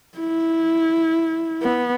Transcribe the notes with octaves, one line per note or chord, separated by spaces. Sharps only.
E4
B3